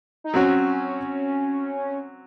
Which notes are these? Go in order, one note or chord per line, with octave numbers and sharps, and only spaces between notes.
D#4
F#3 C4 C#4 F#4